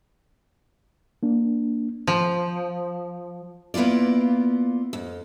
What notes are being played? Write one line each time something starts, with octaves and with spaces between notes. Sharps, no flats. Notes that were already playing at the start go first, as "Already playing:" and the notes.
A#3 D4
F3
A#3 B3 E4 F4 D5
F2